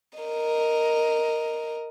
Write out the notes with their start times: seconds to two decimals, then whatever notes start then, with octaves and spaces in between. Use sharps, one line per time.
0.19 A#4 D#5